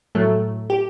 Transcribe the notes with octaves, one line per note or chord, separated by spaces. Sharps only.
A2 F#3 A3
G4